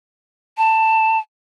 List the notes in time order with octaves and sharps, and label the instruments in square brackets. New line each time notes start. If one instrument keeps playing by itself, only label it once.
[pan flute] A5